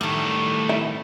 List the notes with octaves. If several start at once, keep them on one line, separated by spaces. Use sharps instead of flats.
A2 D#3 G3 A3
E4